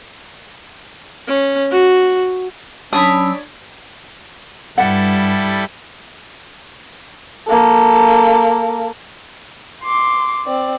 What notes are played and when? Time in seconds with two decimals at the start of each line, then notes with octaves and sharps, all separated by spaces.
1.27 C#4
1.71 F#4
2.93 F#3 C#4 D4 C#5 B5 D#6 E6
4.78 G2 G3 E4 A4 F#5
7.48 A#3 A4
9.83 C6 D6
10.46 C4 D5